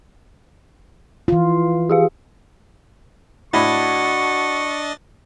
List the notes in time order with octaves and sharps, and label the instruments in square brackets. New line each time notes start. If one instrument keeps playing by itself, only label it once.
[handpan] E3 F4
[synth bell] G4 G#4 F5
[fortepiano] A2 [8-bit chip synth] D4 D#5 A6 [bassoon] F#4 [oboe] C#6